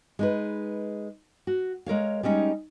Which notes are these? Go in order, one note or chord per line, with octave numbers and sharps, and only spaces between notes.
G#3 D#4 B4
F#4
G#3 A#4 C#5 F5
G3 G#3 C#4 D#4